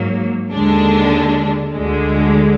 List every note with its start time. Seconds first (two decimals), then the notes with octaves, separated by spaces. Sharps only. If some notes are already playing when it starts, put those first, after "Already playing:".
Already playing: G#2 F#3 A#3
0.52 D#2 D3 G#3 D4
1.72 D2 D3 G#3